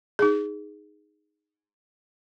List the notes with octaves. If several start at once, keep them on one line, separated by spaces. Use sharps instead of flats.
D#4 G#4